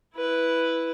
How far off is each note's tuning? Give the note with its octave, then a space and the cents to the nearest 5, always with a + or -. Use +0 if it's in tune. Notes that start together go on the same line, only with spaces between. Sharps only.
E4 +0 B4 +0